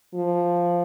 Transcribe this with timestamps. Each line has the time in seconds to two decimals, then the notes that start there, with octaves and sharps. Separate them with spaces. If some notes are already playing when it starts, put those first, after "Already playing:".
0.15 F3